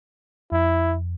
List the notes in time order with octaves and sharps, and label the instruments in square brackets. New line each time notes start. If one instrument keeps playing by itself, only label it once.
[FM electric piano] F2 [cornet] E4